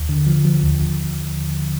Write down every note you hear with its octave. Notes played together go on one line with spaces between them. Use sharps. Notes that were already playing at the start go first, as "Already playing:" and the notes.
Already playing: D#2
D3
F3
F3
D#2
D#2